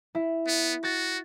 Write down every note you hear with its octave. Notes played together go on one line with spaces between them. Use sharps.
E4
B3
F#4 A6